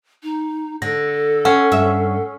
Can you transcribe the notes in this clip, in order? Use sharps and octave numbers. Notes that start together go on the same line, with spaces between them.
D#4
D3 A4 A#6
C#4 F#5
G2 E5